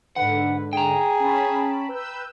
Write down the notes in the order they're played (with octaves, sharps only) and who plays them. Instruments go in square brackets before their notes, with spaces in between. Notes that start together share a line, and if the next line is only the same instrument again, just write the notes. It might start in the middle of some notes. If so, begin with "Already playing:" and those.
[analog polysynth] G#2 D3 [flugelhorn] B4 [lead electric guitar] F#5
[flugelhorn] G#4 [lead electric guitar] G5 A#5
[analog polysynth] C#4 A5 B5
B4 E6 G6